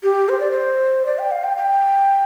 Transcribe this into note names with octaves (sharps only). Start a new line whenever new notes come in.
G4
C5
D5
C5
D5
G5
F5
G5
G5